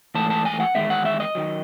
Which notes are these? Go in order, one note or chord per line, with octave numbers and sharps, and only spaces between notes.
G#2 E3 A3 A5
A5
G#5
F#5
E2 D#3 G#3 E5
F#5
E5
D#5
D#3 F#3